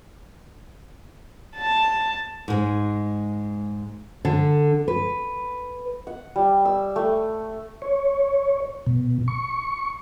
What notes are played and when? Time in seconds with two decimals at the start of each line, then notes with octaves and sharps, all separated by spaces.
1.56 A5
2.48 G#2 G#3
4.25 D3
4.88 B4
6.07 F#5
6.36 G3
6.65 E6
6.96 A3
7.82 C#5
8.86 B2
9.28 C#6